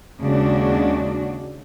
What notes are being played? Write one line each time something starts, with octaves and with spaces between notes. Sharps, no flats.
D#2 C#3 G#3 D4 F#4